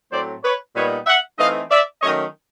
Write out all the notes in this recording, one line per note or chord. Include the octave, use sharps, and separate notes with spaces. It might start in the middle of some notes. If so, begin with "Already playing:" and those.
A2 F#3 A3 C4 C5 D5
B4 C#5
A#2 G3 B3 D#4 B4 C#5
E5 F#5
E3 A3 C4 D#4 D#5 F5
D5 E5
D#3 F#3 A3 C#4 C#5 D#5